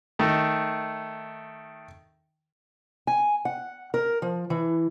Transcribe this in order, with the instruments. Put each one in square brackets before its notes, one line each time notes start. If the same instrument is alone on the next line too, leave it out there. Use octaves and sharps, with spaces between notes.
[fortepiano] D#3 A3
[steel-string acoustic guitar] G#5
F#5
A#4
F3
E3